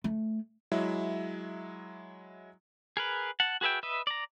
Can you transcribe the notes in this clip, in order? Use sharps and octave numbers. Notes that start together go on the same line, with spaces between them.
A3
F#3 G#3 E4 E5
G#4 A#4 B4
F#5 A5
F#4 G#4 B4 E5 G5
B4 D#5 E5
D5 A#5